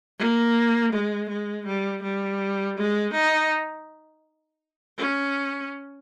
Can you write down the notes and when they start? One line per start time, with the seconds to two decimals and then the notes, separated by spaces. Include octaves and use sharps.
0.19 A#3
0.92 G#3
1.29 G#3
1.66 G3
2.03 G3
2.77 G#3
3.13 D#4
4.98 C#4